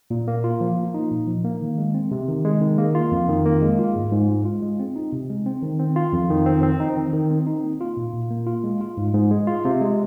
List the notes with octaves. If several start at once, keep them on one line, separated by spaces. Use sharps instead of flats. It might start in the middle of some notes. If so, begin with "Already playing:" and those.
A#2
A#3
F4
F3
A#3
D#4
A#2
F3
A#3
D#3
G#3
C4
C3
D#3
G#3
D#3
A#3
F4
F2
D#3
A#3
G#3
F4
G#2
G#2
G#3
F4
G#3
C4
D#4
C3
G#3
C4
D#3
C4
F4
F2
D#3
C4
C4
D#4
D#3
D#3
C4
D#4
A#3
F4
A#2
A#2
A#3
F4
G#3
F4
G#2
G#2
G#3
F4
C3
G#3